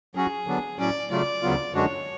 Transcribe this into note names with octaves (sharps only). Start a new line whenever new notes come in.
F#3 C#4 F#4 G#4
D3 F#3 B3 D4
A2 F#3 C#4 D5
C#3 F#3 A3 F4 D5
D2 C#3 F#3 B3 F4
F#2 D3 G#3 D4 F#4 C#5